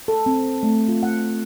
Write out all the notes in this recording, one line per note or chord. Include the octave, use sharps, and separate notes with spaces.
A4
C4
A3
F4
F#5